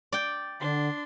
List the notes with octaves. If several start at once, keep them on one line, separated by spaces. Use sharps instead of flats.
D5 G5
D3 D4 C6